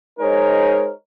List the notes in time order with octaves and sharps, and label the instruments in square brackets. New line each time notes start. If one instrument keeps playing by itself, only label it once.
[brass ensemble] G#3 D#4 G#4 A#4 C5 C#5